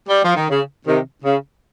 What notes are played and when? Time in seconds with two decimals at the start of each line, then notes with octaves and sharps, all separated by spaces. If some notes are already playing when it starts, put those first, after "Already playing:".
0.09 G3
0.23 F3
0.36 D#3
0.50 C#3
0.87 C3 D#3
1.24 C#3